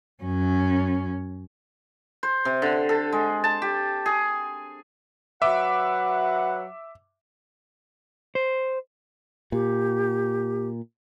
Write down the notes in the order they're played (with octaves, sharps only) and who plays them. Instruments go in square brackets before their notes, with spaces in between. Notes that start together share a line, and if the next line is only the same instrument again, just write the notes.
[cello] F#2 C#4
[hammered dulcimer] C5
C3
D3
A4
G#3
A5
G4
G#4
[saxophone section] F#3 B4 F#5 [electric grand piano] E5 D6
[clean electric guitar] C5
[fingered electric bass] A#2 [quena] G4